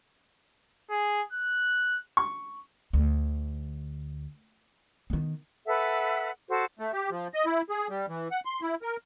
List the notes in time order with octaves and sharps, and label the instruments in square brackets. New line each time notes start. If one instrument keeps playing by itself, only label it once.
[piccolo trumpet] G#4
F#6
[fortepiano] C#6
[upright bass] D2
D#3 B3
[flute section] A4 B4 E5 F#5
F#4 A4 C5
[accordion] A3
G4
F3
D#5
E4
G#4
G3
E3
F#5
C6
E4
A#4